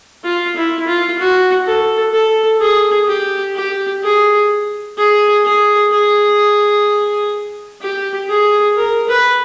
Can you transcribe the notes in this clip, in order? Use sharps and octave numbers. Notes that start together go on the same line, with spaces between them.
F4
E4
F4
F#4
A4
A4
G#4
G4
G4
G#4
G#4
G#4
G#4
G4
G#4
A#4
B4